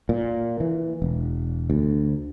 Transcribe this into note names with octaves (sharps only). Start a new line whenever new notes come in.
A#2
E3
E1
D2